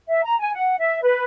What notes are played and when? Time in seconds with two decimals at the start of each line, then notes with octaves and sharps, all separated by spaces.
0.07 E5
0.23 A#5
0.40 G#5
0.55 F#5
0.79 E5
1.02 B4